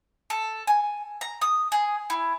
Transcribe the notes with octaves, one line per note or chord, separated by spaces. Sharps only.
A4
G#5
A#5
D#6
G#4
E4